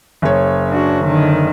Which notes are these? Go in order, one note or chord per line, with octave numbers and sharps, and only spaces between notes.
F#1 C#5
D4 F#4
D3 D#3